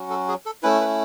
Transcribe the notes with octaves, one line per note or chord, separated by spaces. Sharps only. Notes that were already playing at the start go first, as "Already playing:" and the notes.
Already playing: F#3 C#4 F#4
A4
G#4
A4
A3 C#4 E4 B4
B4